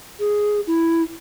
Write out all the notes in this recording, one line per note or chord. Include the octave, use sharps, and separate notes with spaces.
G#4
E4